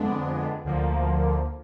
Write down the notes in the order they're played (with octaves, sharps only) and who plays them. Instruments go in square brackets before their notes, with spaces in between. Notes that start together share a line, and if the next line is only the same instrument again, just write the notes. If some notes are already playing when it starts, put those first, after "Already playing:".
Already playing: [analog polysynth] F2 D3 G#3 B3 D4
D2 D3 F3 A#3